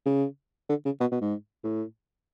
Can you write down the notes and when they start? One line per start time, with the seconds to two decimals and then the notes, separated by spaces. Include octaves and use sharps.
0.06 C#3
0.69 D3
0.85 C#3
1.00 B2
1.12 B2
1.21 G#2
1.64 A2